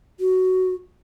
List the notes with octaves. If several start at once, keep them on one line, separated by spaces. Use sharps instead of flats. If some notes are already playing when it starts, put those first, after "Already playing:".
F#4